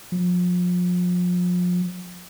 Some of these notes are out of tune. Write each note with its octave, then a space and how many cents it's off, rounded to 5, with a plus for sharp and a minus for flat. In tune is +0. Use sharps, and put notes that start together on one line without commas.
F3 +35